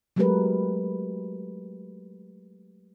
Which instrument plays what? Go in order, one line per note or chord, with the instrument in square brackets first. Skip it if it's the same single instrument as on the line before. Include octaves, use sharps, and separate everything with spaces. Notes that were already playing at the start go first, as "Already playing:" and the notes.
[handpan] F#3 G#3 A3 G4 A#4 B4